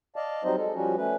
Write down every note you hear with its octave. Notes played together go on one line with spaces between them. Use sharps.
D5 D#5 F5 A5
F#3 G3 C4 D#4 C5 D#5
G#3 A4
F3 G3 C#4 F#4
A3 C#4 B4